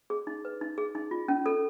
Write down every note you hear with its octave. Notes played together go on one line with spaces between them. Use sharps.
G#4
D#4
B4
D#4
G#4
D#4
F4
C#4
A4